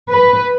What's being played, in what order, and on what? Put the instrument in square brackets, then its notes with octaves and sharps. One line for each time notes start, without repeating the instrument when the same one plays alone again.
[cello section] B4